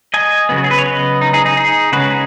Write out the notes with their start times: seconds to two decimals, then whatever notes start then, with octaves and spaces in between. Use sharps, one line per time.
0.14 D#5 G#5
0.49 C#3 F#3 B3
0.57 F#4
0.64 G#4
0.71 B4
0.78 C#5
0.86 B4 D#5
1.21 D#4
1.33 D#4 G#4
1.45 D#4 G#4
1.57 D#4 G#4
1.92 C#3 G#3 C#4 F#4 B4
2.11 D#4 G#4